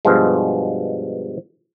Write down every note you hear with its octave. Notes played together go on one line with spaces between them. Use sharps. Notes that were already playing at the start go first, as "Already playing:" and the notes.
G2 B2 F3 G#3